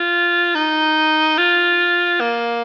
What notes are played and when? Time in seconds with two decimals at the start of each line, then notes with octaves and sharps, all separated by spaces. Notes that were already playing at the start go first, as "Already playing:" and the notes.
Already playing: F4
0.55 D#4
1.37 F4
2.20 A#3